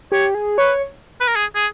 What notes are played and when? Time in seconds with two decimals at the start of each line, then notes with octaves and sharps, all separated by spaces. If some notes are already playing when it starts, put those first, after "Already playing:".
0.12 G4 C#5
0.35 G#4
0.58 B4 C#5
1.20 B4
1.28 A#4
1.36 G#4
1.55 G#4